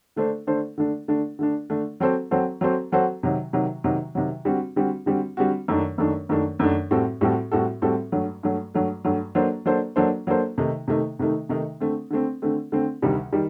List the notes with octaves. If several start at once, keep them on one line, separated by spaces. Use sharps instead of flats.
D3 A3 D4 A4 C5
D3 A3 D4 A4 C5
D3 A3 D4
D3 A3 D4
D3 A3 D4
D3 A3 D4
F#3 C4 F#4 A4 C5
F#3 C4 F#4 A4 C5
F#3 C4 F#4 A4 C5
F#3 C4 F#4 A4 C5
C3 D#3 F#3
C3 D#3 F#3
C3 D#3 F#3
C3 D#3 F#3
D3 G3 C4 F#4
D3 G3 C4 F#4
D3 G3 C4 F#4
D3 G3 C4 F#4
F#2 D#3 A3 D4
F#2 D#3 A3 D4
F#2 D#3 A3 D4
F#2 D#3 A3 D4
A2 G3 C4 F#4 A4
A2 G3 C4 F#4 A4
A2 G3 C4 F#4 A4
A2 G3 C4 F#4 A4
G2 F#3 A3
G2 F#3 A3
G2 F#3 A3
G2 F#3 A3
F#3 A#3 D4 A4 C5
F#3 A#3 D4 A4 C5
F#3 A#3 D4 A4 C5
F#3 A#3 D4 A4 C5
C3 D#3 A3 D#4
C3 D#3 A3 D#4
C3 D#3 A3 D#4
C3 D#3 A3 D#4
D3 A3 C4
D3 A3 C4
D3 A3 C4
D3 A3 C4
D2 C3 D#3 G3
D#3 G3